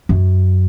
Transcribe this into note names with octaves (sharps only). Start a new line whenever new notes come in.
F#2